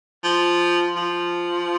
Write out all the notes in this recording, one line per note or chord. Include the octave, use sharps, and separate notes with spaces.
F3
F3